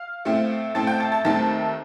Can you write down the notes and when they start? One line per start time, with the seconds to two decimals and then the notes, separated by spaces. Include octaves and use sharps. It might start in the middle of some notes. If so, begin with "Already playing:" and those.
Already playing: F5 F6
0.25 A2 A3 C4
0.75 A2 A3 C4 A5 A6
0.87 G5 G6
1.00 A5 A6
1.12 A5 A6
1.25 D#2 D#3 A3 C4 A5 A6